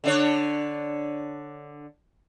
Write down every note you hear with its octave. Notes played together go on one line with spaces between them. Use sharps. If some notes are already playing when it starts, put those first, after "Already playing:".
D3 D4 C#5